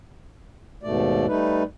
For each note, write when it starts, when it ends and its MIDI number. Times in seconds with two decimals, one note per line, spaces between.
0.83 1.26 39
0.83 1.26 44
0.83 1.26 47
0.83 1.26 57
0.83 1.26 74
1.28 1.63 55
1.28 1.63 57
1.28 1.63 63
1.28 1.63 71